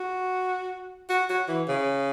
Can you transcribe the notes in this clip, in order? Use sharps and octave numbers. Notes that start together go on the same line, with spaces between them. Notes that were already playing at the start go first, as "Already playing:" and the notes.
Already playing: F#4
F#4
F#4
E3
C#3